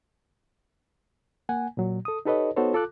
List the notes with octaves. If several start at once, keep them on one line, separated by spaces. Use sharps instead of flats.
A#3 F#5 G#5
A#2 F#3
A4 D#6
D#4 G4 A4 B4 C#5 D#5
B3 D#4 F#4 A4 C5 C#5
F4 A4 D6 F#6